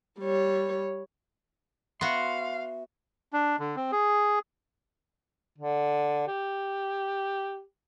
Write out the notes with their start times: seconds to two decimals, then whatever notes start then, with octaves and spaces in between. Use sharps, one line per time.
0.20 G3 C#5
2.01 B3 F#4 E5 F5 C6
3.33 D4
3.59 D3
3.76 C4
3.92 G#4
5.59 D3
6.28 G4